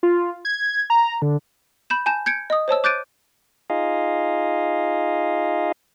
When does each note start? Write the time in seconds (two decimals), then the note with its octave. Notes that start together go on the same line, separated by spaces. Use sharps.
0.03 F4
0.45 G#6
0.90 A#5
1.22 D3
1.90 B5 G6 E7
2.06 G#5 A5 G6 E7
2.26 G6 G#6 C#7 D7
2.50 D#5 D#6
2.68 C5 C#5 A5 E6
2.84 D6 F#6 G6 A6 D7 D#7
3.70 D#4 F4 G#4 D#5 F5